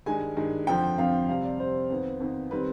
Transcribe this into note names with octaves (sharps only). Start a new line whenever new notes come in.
G2 D#3 G#3 G#5
G2 D#3 G#3
F2 D3 F3 C4 G5
F2 D3 F3 C4 F5
C3 G3 C4 F5
D5
C3 G3 C4 C5
F2 D#3 B3
F2 D#3 B3
D#3 G3 C4 B4